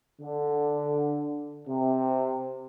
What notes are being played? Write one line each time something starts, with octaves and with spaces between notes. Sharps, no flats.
D3
C3